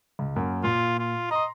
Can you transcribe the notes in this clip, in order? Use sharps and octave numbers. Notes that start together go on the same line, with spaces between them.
C#2
F#2 A#3
A#2 F4
F4
D#5 A#5 C6